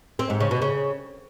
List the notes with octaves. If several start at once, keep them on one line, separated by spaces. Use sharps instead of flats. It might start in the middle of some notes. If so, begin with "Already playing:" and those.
C4
G#2
C#3
B2
C#3